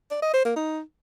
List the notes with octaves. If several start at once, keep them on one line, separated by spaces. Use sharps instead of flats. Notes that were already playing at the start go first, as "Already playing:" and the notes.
D5
D#5
C5
A#3
D#4